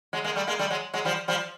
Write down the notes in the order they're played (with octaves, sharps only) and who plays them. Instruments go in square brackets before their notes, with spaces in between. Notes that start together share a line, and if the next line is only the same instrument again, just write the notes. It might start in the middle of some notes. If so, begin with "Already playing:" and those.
[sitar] F#3 G#3
G#3 A#3
G3 A3
G#3 A#3
G3 A3
F#3 G#3
F#3 G#3
F3 G3
F3 G3